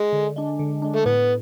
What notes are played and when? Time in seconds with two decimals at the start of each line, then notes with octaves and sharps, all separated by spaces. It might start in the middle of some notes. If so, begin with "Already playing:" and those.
Already playing: G#3
0.12 D3
0.36 G#3 D4
0.59 D3
0.82 G#3 D4
0.95 A3
1.05 A2 B3